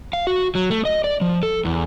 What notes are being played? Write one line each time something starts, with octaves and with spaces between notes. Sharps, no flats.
F5
F#4
F#3
A3
D#5
D5
F3
A4
E2